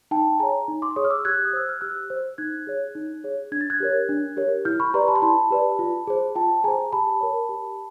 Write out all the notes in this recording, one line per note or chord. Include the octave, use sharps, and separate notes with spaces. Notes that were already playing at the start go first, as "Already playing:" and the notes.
D#4 G5 A5
G#4 C#5 G#5 A#5
D#4
C6 D6
G#4 C#5 C#6 D#6
F6
D6 E6
G4 F#6 G#6
D#6
C5 E6
F6
G4 E6 F#6
C5
D#4 F#6 G#6
G#4 C#5
D#4
G#4 C#5
D4 G#6
A6
F#6 G#6
G4 A#4 C#5
D4
G4 A#4 C#5
E4 F6 G6
B5 C#6
G4 B4 D5 A#5 C6
A5 B5
C6
E4 A5 B5
G4 B4 D5
F4
G#4 C5
F4 G5 A5
G#4 C5 G#5 A#5
G4 A5 B5
A#4 C#5
G4